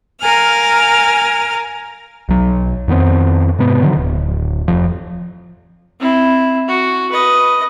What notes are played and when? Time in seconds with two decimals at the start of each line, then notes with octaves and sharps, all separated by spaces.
0.21 A#4 F5 G#5 F6
2.29 B1 F#3
2.88 F2 D#3 B3 C4
3.59 G#2 C3 B3
3.82 D3 D#3 F3 F#3
3.97 D1
4.68 F1 F2 F3
6.00 C4 E4
6.68 F#4
7.11 B4 D#5